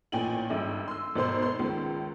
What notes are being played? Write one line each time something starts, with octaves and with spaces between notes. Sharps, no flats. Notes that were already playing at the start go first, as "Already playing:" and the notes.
A1 A#2 G5 G#5 F#7
G#1 G2 E5
C6 E6
G#1 B2 C5 C6
C5 C6
C#2 D#3